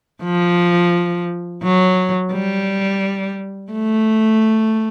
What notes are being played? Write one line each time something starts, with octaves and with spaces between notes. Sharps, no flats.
F3
F#3
G3
A3